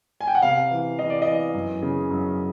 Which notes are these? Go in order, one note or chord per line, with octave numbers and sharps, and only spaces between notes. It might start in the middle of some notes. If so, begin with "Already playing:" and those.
G#5
G5
F#5
C3 F5
E3
E3 D#5
D5
E3 D#5
F#2
C#3
F#2